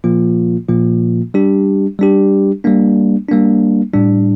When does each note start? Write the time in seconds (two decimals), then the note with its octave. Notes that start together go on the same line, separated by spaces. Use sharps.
0.04 A#2 F3 A#3 F4
0.69 A#2 F3 A#3 F4
1.34 G3 D4 G4
1.99 G3 D4 G4
2.64 G3 A#3 D4
3.28 G3 A#3 D4
3.94 A2 G3 D4